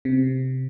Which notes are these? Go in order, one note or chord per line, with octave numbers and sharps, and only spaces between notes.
C3